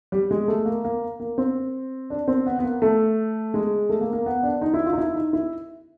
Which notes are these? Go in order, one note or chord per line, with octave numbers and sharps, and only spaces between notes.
G3
G#3
A3
A#3
A#3
A#3
C4
D4
C4
B3
B3
A#3
A3
G#3
A3
A#3
A#3
B3
D4
D#4
E4
F4
D#4
E4
D#4
E4